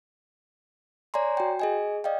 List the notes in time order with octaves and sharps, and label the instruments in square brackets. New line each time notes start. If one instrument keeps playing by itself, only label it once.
[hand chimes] C#5 D5 G#5 A#5 C6
F#4 G5
G#4 D#5 G#5
D5 D#5 F5 G5